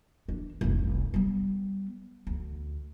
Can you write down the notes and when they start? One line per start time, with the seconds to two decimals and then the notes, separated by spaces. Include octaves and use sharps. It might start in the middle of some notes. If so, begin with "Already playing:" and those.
0.28 D4
0.61 F1 C2
1.14 G3 B3
2.27 D2